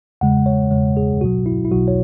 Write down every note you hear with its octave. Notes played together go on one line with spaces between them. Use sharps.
E2 C#3 G#3 F#5
C#5
E2 C#3 G#3 C#5
G#4
B1 B2 F#3 F#4
E4
E4
B1 B2 F#3 F#4
C#5